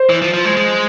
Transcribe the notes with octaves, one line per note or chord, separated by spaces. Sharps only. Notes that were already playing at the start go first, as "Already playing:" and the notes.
Already playing: C5
E3
F3
F3
G#3
G#3